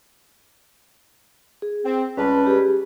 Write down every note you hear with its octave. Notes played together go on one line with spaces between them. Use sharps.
G#4
C4
C#2 G3 C#4 B4 A5
G4 G#4